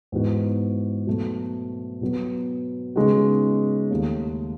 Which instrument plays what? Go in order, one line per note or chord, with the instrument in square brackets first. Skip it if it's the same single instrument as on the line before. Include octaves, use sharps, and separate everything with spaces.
[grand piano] G#2 E3 B3 D#4 F#4
B2 F#3 A3
B2 F#3 B3
C#3 G#3 B3 D#4 F#4
D#2 D#3 A3